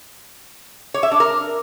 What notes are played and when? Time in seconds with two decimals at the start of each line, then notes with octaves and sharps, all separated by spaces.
0.94 C#5
1.03 E5
1.12 D4
1.20 A#4